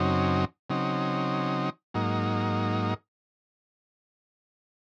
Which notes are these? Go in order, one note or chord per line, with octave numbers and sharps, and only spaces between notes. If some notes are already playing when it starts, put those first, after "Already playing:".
Already playing: F#2 C#3 F#3 C4 D#4
C#3 F#3 C4 D#4
G#2 F#3 A#3 D#4